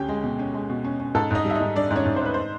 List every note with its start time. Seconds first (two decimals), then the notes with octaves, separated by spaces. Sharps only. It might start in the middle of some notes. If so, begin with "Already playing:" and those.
Already playing: D2 C#4 G4 G5
0.09 G#3
0.23 B2
0.39 C#4
0.54 G#3
0.70 B2
0.84 C#4
1.00 C#4
1.15 G#2 A4 A5
1.31 G#2 D#4 D#5
1.45 G3
1.50 E5
1.55 D#4 D#5
1.61 G#2
1.76 G3 D4 D5
1.91 G#2
1.96 C#4 C#5
2.06 G#2
2.16 C5
2.21 G#2 B4
2.34 C5